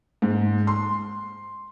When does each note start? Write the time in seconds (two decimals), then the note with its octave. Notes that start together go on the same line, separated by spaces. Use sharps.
0.22 G#2
0.67 C6